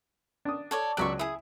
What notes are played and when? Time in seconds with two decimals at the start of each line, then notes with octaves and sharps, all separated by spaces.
0.45 D4 D#6
0.71 A4 C#5 D5
0.97 C#2 F#3 D5 E5 C#6 F#6
1.19 E4 G#4 D#6